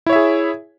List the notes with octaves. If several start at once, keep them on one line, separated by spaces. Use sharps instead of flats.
E4 G#4 C#5 E5